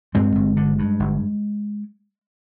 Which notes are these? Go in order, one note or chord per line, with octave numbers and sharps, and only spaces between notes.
G2 G#3 C4
G1
D3
G2
G1